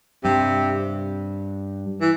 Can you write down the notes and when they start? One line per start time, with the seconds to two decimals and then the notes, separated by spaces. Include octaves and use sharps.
0.24 G2 C3
2.01 E3